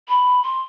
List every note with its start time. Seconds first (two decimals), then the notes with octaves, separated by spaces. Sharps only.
0.08 B5
0.43 C6